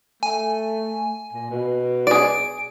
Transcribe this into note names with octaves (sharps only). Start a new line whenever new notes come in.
A3 G#5
A#2
B2
G#4 D5 D7